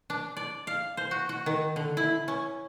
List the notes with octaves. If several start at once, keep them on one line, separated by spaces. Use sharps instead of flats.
D4
D5
F5
C5
F#4
F#4
D#3
D3
E4
C#4